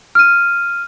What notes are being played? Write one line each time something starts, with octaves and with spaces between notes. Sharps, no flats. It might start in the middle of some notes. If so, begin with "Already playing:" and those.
F6 D#7